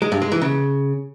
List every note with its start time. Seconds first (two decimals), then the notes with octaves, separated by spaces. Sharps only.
0.02 G#3
0.12 G2
0.22 G#3
0.32 E3
0.42 C#3